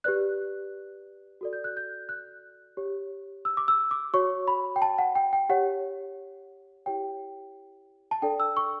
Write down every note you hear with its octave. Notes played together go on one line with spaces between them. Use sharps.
G4 B4 D5 F#6
F#4 A4 D5
G6
F#6
G6
F#6
G4 C#5
E6
D6
E6
D6
F#4 C#5 C#6
B5
G5
A5
F#5
G5
G5
G4 C#5 F#5
E4 G4 C#5 G5
A5
D4 A4 D5 G5
E6
C#6